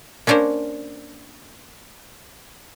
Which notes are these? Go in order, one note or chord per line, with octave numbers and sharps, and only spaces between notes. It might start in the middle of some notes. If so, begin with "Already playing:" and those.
A#3 C#4 D4 A#4 C5